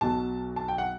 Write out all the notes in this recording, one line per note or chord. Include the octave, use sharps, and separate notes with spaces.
B1 B2 F#3 A5
A5
G5
F#5